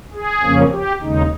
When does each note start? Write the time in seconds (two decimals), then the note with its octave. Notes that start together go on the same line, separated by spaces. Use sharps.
0.13 G#4
0.43 F2 C#3 F3 A#3 C#4
0.72 G4
1.01 D#2 C#3 G#3 D#4